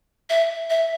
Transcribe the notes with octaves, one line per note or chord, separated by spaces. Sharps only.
E5
E5